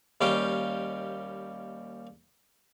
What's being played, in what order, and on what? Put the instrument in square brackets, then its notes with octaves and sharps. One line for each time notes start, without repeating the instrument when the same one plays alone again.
[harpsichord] D#2 G3 C#4 F5 G5